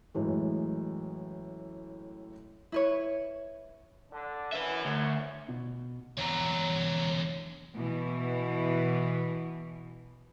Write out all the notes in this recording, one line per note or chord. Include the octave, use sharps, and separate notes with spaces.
F#2 A2 E3 G#3
E4 B4 C#5
D3 D4
F#2 B4 E5
D2
B2
E2 D3 C#5 A#5
B2 E3